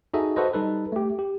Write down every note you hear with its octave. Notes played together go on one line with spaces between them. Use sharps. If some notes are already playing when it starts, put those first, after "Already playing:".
D#4 F#4 G#4 A4 D#5 E5
F#4 A4 B4 C5 D#5
G3 D#4 A4 B4
A3 G4
G4